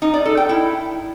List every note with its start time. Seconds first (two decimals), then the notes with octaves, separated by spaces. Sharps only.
0.02 D#4
0.14 D5
0.26 A4
0.37 G5
0.49 E4